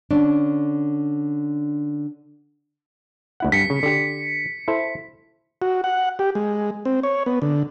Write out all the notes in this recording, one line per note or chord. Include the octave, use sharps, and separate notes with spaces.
D3 C#4 D4
D2 E4 F#5
G2 B6 C#7
C#3
D3 G4
E4 A4 C5
F#4
F#5
G4
G#3
C4
C#5
B3
D3